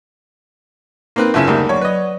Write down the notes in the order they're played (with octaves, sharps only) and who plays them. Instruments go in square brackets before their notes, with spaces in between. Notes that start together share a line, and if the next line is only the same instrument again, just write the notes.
[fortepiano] A#3 C4 B4 [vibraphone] D#4 A#4
[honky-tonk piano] F#1 E5 E7 [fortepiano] C#4 E4 F4
[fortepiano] D2 G3 A#3
[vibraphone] F#3 D5 [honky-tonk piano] C#5
[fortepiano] B4 D#5